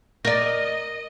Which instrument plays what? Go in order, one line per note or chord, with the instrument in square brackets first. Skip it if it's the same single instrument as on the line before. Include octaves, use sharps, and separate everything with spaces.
[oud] A#4 D5 [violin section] D#5 [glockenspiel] A#6